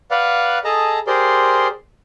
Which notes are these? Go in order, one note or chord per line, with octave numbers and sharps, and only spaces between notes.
B4 D5 F5 F#5
G#4 A4 D#5 A5 A#5
G4 G#4 A#4 C5 D5 C6